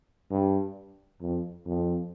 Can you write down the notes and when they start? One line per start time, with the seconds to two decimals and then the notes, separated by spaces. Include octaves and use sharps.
0.31 G2
1.21 F2
1.66 F2